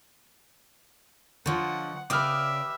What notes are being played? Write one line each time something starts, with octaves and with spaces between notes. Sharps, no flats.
D3 F3 C5 C#5 D#5 F#5
C#3 G4 B4 D5 E5 D6 D#6 F6